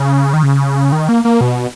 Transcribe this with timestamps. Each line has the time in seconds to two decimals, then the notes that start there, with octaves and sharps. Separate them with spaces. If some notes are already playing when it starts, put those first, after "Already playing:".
Already playing: C#3
0.33 D#3
0.43 C#3
0.92 D#3
1.09 A#3
1.25 A#3
1.41 B2